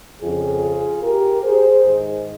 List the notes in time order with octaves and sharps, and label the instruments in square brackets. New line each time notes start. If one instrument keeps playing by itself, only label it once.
[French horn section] F2 C#3 F4 G#4
G4 A#4
G#4 C5
G#2 D#3